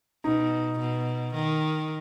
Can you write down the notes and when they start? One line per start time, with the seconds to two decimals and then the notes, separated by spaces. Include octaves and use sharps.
0.24 B2 D#4
0.79 B2
1.35 D#3